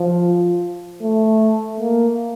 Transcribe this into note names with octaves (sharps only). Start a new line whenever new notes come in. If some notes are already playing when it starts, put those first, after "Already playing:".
Already playing: F3
A3
A#3